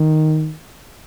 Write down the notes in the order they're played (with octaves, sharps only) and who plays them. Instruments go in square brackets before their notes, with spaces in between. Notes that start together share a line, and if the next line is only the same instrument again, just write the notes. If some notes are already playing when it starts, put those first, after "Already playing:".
Already playing: [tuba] D#3